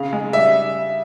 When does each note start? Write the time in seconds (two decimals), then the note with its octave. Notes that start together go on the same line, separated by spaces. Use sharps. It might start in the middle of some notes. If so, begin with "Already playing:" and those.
Already playing: C#3 F5
0.13 G#3
0.33 G3 E5